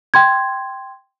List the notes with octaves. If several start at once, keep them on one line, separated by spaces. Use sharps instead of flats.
G5 C6 G#6